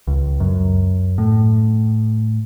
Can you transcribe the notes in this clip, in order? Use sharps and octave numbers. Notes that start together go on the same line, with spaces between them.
C#2
F#2
A2